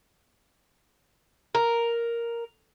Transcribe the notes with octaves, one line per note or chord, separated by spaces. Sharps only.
A#4